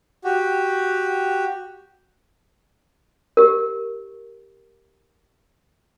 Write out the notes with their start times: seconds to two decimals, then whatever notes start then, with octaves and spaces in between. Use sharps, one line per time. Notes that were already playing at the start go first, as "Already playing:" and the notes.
0.24 F#4 G4
3.37 G4 A#4